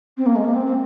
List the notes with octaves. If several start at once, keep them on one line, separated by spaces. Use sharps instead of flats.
C4
A#3
G#3
A#3
C4
C4